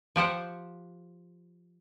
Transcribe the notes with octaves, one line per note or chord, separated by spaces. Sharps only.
F3 G4 C5 F#5